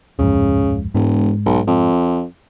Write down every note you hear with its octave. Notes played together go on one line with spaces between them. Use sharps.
D1 F2 G#2 C#3
E1 G#2
B1
F2